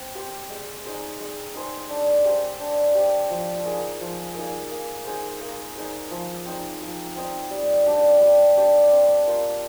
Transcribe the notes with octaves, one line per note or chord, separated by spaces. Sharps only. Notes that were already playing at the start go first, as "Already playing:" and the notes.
Already playing: C4
G4 C5
G#3
D#4 G#4 C5
G#3
D#4 G#4 C5
D4
G4 C5
D4
G4 C5
F3
A#3 D#4 G#4
F3
A#3 D#4 G#4
A#3
D#4 G#4 C5
A#3
D#4 G#4 C5
F3
C4 D#4
F3
C4 D#4
G3
D4 G4 D5
G3
D4 G4 D5
C4
F4 A#4